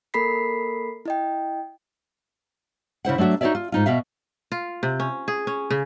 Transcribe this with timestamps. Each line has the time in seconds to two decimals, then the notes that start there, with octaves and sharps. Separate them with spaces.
0.14 A#3 A4 A#4 B5 B6 C7
1.05 E4 D#5 G5
3.05 C#3 E4 C5 F#5
3.18 F#3 A3 D4 F#4 E5
3.41 D#4 F#4 G#4 C#5 D5 E5
3.55 F4
3.72 G#2 D#4 F4
3.86 B2 F#4 E5 F5
4.52 F4
4.83 C3
5.00 C#4
5.28 G#4
5.47 C#4
5.70 C#3